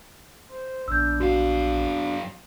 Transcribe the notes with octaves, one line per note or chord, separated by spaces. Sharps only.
C5
A#1 B3 D4 E6 G6
F#2 F#4 F5